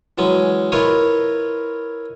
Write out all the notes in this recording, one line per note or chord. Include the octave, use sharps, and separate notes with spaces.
E3 F#3 G#3 C#4
E4 F4 A#4 B4 C#5 D#5